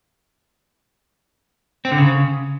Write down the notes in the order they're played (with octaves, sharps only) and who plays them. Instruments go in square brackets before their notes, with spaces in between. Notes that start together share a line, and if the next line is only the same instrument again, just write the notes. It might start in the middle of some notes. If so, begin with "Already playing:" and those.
[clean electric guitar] C4
D3
C#3